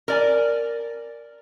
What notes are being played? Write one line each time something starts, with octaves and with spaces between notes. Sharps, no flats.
A#4 D5 G#5